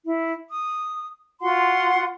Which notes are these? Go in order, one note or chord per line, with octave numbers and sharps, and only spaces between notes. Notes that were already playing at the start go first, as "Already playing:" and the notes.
E4
D#6
F4 F#4 F#5 C6